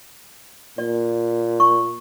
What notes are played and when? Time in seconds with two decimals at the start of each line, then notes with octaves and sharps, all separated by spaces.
0.78 A#2 D5
1.60 C#6